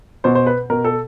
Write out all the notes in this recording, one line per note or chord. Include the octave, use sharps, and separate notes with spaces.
B2 C5
C5
B4
B2 A#4
A4